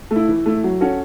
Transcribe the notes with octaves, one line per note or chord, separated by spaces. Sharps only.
A3
E4
E3
A3 E4
F#3
C#4 F#4 A4